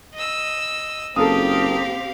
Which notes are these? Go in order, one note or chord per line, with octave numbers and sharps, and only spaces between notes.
D#5 E6
F#1 C4 G4 A4 A#4 F5 D#6